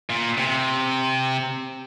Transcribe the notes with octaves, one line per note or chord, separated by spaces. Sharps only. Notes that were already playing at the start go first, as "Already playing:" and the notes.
A#2
C3